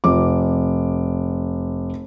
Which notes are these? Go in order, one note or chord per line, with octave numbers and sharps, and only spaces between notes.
F1 D6